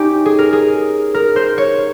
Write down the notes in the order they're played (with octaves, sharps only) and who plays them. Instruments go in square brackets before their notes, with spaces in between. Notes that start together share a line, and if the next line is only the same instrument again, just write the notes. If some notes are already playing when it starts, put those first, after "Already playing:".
Already playing: [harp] C#4 D#4 G4
G#4
A#4
G#4
A#4
C5
C#5